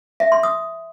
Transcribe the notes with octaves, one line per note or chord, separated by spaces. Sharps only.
E5
C6
D#6